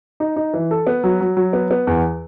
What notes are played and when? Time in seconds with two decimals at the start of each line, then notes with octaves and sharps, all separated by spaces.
0.20 D#4
0.36 D#4
0.54 E3
0.71 A4
0.87 B3
1.04 F#3
1.21 F#3
1.37 F#3
1.53 B3
1.71 B3
1.87 E2